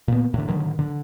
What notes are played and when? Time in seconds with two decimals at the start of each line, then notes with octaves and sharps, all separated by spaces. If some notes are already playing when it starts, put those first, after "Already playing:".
0.08 A#2 B3
0.34 A2 D3
0.48 A2 D3 D#3 F#3
0.79 D3